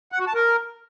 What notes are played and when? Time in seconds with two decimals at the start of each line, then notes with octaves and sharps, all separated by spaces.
0.12 F#5
0.20 F#4
0.27 A5
0.35 A#4